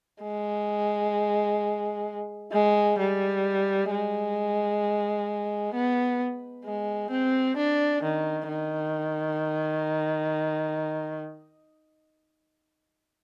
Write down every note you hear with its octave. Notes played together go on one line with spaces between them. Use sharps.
G#3
G#3
G3
G#3
B3
G#3
C4
D4
D#3
D#3